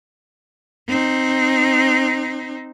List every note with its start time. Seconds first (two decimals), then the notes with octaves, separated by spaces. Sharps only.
0.88 C4 D#4